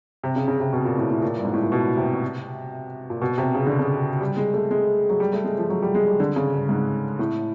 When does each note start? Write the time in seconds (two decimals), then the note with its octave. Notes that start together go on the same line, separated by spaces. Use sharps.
0.23 C3
0.36 C#3
0.48 C#3
0.60 C3
0.73 B2
0.85 A#2
0.98 A2
1.10 A2
1.22 A#2
1.36 G2
1.45 G#2
1.53 A2
1.62 A#2
1.72 B2
1.97 C3
3.10 A#2
3.22 B2
3.38 C3
3.55 C#3
3.67 D3
3.79 C#3
4.21 G3
4.37 G#3
4.54 A3
4.71 G#3
5.09 F#3
5.20 G3
5.33 A3
5.44 G#3
5.58 F3
5.70 F#3
5.82 G3
5.95 G#3
6.07 G3
6.20 D3
6.36 C#3
6.53 G2
6.69 G#2
7.19 A2